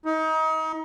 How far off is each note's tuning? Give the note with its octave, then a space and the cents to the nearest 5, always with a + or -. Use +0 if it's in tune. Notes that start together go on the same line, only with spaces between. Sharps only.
D#4 +30